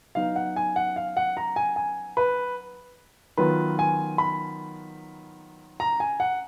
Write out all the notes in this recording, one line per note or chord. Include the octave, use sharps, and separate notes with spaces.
F#3 B3 D#4 F5
F#5
G#5
F#5
F5
F#5
A#5
G#5
G#5
B4
D#3 F#3 B3 F4 B4
G#5
B5
A#5
G#5
F#5